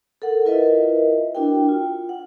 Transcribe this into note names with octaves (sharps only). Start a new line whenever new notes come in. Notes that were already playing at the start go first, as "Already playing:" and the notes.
A4 A#4 F#5
E4 F4 A#4 B4 D#5 E5
D4 E4 F#4 A#4 G5
F4
F#5